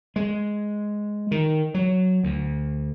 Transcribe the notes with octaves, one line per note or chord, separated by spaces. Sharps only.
G#3
D#3
F#3
D2